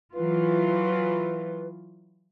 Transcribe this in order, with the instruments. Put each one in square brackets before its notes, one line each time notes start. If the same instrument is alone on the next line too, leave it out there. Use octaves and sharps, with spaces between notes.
[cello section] E3 F#3 F4 [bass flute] B4